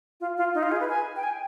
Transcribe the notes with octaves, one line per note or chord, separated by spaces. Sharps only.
F4
F4
D#4
F4
G#4
B4
G#5
G5
G#5